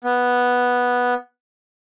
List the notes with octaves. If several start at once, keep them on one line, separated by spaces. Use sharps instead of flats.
B3